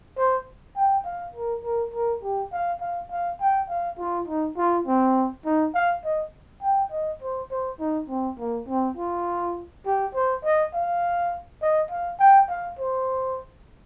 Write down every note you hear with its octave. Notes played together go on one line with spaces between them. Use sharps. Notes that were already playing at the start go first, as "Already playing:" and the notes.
C5
G5
F5
A#4
A#4
A#4
G4
F5
F5
F5
G5
F5
F4
D#4
F4
C4
D#4
F5
D#5
G5
D#5
C5
C5
D#4
C4
A#3
C4
F4
G4
C5
D#5
F5
D#5
F5
G5
F5
C5